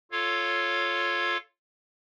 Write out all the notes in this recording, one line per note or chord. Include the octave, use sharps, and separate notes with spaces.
F4 A4 C#5 F5